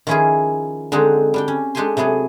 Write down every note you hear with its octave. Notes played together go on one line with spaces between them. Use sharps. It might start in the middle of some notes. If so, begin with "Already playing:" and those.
D#3 F3 C#4 E4 F4 G#4
D3 G#3 C4 D#4 F#4 G#4
G3 D4 G5
C#4
G#3 D4 G4 A4 G#5 C6
C3 F#3 B3 G#4 A4